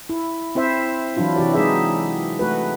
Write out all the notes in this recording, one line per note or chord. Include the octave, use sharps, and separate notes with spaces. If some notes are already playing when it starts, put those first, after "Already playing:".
E4
C4 E4 C5 E5
E3 F#3 D4 E4 F4
C3 E3 F#4 G4 D5
G#3 D#4 E4 G#4 E5
A3 F#4 B4